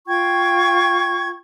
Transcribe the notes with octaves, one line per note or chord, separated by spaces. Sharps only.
F4 G5 C#6 G#6